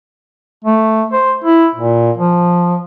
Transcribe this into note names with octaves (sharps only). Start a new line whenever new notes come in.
A3
C5
E4
A#2
F3